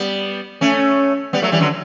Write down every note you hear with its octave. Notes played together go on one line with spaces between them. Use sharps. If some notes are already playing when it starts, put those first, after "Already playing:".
Already playing: G3 B3
A3 C#4
G3 B3
F#3 A3
E3 G3
D3 F#3